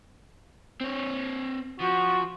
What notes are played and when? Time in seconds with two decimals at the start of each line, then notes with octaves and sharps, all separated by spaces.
0.80 C4 C#5
1.80 F3 F#4